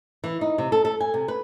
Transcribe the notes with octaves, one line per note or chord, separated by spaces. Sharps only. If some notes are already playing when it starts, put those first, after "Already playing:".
E3
D#4
C3
A4
A4
G#5
C3
B4